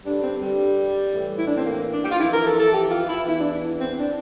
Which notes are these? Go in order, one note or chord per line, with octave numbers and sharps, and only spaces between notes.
G2 D3 D4
C4
G3
A2 E3
E4
D4
C4
A#3
D4
G4
F4
F2 E3 E4
A#4
A4
A4
G4
F4
E4
E2 E3 E4
D4
E4
C4
D4